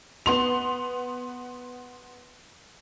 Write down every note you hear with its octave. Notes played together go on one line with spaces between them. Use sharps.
B3 C6 F7